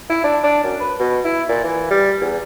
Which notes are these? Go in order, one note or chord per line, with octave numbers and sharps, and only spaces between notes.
E4
D4
D4
F#2
B4
B2
E4
A#2
E3
G3
E2